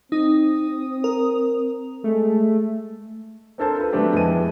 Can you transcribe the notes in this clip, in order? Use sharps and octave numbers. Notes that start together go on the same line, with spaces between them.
C4 D#4 D#6
A#4
G#3 A3
C4 D4 A4 A#4 C5 A5
F4 A4 B4
F#3 A3 B3 C4 D4 G4
F2 E3 G#3 B3 A5 D#7